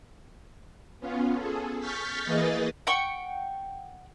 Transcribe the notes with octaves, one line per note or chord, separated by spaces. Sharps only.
B3 C#4 F4
G#4 A4
C#6 F6 G6 A6 B6
E3 A#3 G#4 B4 D#5 A6
F#5 G5 C#6